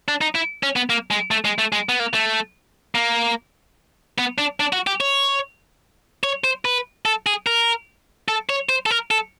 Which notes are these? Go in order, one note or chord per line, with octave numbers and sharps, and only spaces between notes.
D4
D#4
E4
C#4
B3
A#3
G#3
A3
G#3
A3
G#3
B3
A#3
A3
A#3
B3
D4
D4
F#4
G4
C#5
C#5
C5
B4
A4
G#4
A#4
A4
C#5
C5
A4
A#4
A4